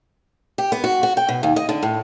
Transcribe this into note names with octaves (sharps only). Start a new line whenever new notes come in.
G4
B3
F#4
F#4
G5
B2
D#2
D#5
D3
A2